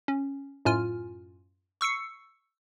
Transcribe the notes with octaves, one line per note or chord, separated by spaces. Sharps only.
C#4
F#2 A2 F4 G#5 F6
C#6 E6 C7 C#7